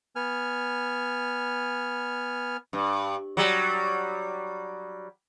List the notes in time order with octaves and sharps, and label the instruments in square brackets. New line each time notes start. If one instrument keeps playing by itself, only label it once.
[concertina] B3 G#5 F6
[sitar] G2
F#3 G3